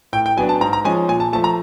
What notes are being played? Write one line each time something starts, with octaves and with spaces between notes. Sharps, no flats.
A2 G5
G5
F#3 B3 D4 G#5
A5
G#2 A#5
A#5
F3 G#3 C#4 G#5
A#2 G#5
A5
F3 A3 A5
A#5